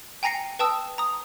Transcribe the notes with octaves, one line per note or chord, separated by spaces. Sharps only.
G5 G#5 A#5 A#6 C7 C#7
B4 G5 A5 D#6 E6
A#5 D#6